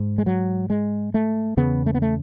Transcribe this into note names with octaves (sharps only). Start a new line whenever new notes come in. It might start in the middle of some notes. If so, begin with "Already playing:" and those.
Already playing: G#2
G#3
F#3
G#3
A3
E2 C#3 B3
A3
B3
A3